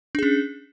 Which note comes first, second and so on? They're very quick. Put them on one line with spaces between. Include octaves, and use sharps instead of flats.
D4 G#4 C#4